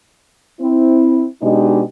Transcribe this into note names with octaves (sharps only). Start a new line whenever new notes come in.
C4 E4
B2 G#3 D4 D#4 G4 D#5